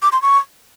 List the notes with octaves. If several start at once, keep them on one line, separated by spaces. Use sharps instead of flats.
D6
C6
C#6